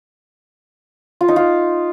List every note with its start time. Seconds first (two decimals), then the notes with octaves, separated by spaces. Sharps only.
1.21 F4
1.28 D#4
1.36 F4